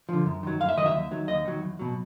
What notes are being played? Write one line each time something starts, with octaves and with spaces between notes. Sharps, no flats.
D3 F3
F#2
D#3 F#3
F#2 F5
E5
D#3 F#3 D#5 E5
D#2
D#3 F#3
D#2 D#5
D#3 F#3
E2
B2 F#3